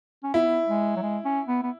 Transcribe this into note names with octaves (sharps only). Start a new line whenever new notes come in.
C#4
B3 E4
G#3
F#3
G#3
C#4
B3
B3